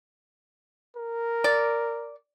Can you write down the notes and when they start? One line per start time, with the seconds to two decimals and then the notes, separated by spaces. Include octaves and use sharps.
0.96 A#4
1.44 D5